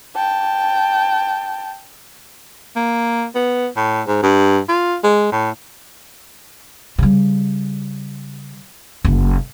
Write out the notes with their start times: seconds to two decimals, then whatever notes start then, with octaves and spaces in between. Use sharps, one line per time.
0.15 G5 A5
2.76 A#3
3.35 B3
3.76 A2
4.07 G#2
4.23 G2
4.69 F4
5.03 G#3
5.32 A2
6.99 C#3 G3
9.05 F#1